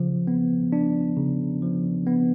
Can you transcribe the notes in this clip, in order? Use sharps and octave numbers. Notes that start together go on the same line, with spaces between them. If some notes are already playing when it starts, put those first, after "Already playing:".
Already playing: C#3 F3
B3
D4
C#3
F3
B3